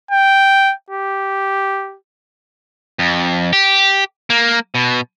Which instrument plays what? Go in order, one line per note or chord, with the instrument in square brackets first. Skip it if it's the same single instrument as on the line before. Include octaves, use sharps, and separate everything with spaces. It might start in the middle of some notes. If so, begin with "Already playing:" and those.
[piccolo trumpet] G5
G4
[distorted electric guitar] F2
G4
A#3
B2